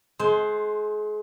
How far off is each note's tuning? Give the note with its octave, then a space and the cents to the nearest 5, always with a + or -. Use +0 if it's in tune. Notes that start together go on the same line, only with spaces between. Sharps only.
G#3 +35 C5 +0